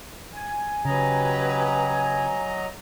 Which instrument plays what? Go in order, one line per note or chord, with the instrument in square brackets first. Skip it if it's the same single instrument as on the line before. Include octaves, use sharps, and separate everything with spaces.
[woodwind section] G#5
[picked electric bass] C#3 [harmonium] F#3 D#5 A#5 [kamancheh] G4 B4